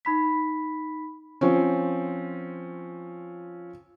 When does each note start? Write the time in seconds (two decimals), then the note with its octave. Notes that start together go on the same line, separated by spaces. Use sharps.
0.05 D#4 B5 B6
1.41 F3 C4 C#4